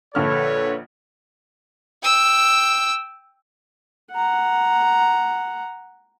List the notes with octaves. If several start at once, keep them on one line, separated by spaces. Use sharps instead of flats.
A#1 D3 A4 B4 C#5 F6
G5 E6
F#5 A#5